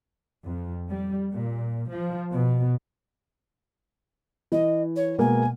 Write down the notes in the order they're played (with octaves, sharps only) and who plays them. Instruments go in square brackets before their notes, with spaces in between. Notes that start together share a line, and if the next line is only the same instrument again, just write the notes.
[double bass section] F2
G3
A#2
F3
B2
[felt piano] E3 [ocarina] D#5
[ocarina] C#5
[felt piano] B2 G#3 A#3 [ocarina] G#5